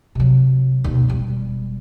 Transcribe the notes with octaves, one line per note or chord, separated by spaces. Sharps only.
C3 F#3
D#2 B2
E1 G3